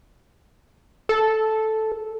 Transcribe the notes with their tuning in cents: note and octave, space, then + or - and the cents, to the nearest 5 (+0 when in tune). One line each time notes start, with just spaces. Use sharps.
A4 -5